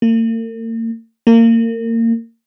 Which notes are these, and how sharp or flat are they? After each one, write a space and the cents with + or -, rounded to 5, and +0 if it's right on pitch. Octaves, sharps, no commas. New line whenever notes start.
A#3 -45
A#3 -30